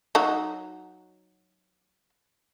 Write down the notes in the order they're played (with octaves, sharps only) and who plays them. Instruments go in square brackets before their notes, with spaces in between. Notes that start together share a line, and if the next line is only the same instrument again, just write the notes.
[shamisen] F#3 D#4 F#4